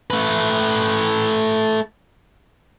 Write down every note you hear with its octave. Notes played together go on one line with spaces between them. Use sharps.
A3 B4